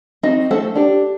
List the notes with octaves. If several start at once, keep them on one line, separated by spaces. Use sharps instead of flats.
C4 D#4 F#4 D#5
A3 C#4 A4 C5 F#5
D4 G4